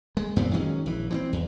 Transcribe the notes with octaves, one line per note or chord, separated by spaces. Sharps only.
G#3
F#2 A#2 B3 C4
D#3 F#3 G#3 C#4
A#1 E3
E3 B3 C4
E2